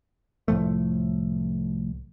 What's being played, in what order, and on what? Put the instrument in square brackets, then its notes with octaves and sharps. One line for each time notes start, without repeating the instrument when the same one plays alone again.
[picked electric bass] C2 A2 F3 A3